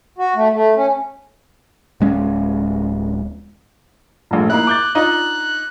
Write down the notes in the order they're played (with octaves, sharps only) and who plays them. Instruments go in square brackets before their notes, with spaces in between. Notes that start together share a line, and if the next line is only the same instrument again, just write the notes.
[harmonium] F#4
A3
A3
C#4
[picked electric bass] D1 G#3 C#4
[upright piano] A#1 G2 [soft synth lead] A3
[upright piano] A#3 D#4 E4 [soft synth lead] F#6
[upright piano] D6 G6 A6
[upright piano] D4 D#4 F4 [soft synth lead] F#6